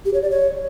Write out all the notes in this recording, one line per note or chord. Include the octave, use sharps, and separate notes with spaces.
G4
C#5
D5
C#5